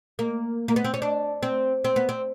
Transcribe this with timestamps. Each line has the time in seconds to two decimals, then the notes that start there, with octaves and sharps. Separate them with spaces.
0.19 A#3
0.68 A#3
0.76 B3
0.85 C4
0.94 C#4
1.02 D4
1.43 C4
1.84 C4
1.96 B3
2.09 C4